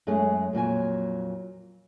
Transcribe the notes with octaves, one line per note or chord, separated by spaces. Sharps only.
F#2 G#3 A3 C#4 G#4
F2 A#2 F#3 G#5